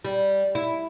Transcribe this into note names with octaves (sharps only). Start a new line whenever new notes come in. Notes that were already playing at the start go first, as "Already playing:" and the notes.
G3
E4